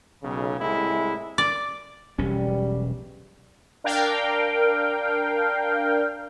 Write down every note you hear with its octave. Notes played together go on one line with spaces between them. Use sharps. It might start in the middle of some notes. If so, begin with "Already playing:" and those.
B1 C#3
C2 A2 G#3 E4
D5
E1 B1 G3 C#4
D4 A#4 F5 G5